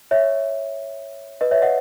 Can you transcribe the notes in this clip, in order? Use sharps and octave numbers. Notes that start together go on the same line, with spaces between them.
C#5 E5
B4 D#5
C#5 E5
D#5 F#5